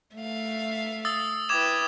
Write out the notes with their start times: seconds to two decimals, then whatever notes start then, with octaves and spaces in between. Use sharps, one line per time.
0.15 A3 E5 F5
1.05 D#6 E6 A6
1.49 E4 B4 G5 D6 G#6 E7